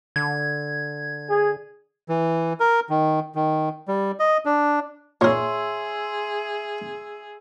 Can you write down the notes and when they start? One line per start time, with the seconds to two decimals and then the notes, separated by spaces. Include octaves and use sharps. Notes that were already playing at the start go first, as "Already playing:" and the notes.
0.16 D3 G#6
1.29 G#4
2.09 E3
2.60 A#4
2.90 D#3
3.35 D#3
3.88 G3
4.20 D#5
4.46 D4
5.21 A#2 G#4 A#4 C#5 E5 C6